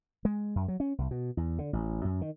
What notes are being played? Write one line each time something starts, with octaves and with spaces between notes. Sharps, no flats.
G#3
F#2
F#3
C#4
C2
B2
E2
D3
A1
F#2
D#3